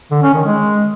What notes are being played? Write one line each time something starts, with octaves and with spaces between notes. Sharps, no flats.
D3
C#4
D#3
G#3